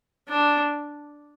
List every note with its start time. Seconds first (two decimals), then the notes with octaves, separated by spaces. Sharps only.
0.28 D4